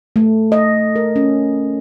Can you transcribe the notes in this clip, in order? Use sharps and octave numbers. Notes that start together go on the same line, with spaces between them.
A3
D#5
A#4
C#4